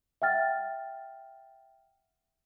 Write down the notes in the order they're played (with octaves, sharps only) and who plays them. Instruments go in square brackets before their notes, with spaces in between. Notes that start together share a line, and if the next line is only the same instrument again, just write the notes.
[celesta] E5 F#5 G5 F6 A6